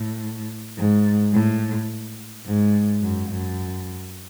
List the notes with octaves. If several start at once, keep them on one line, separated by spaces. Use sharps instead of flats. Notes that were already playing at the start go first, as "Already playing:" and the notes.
Already playing: A2
G#2
A2
G#2
F#2
F#2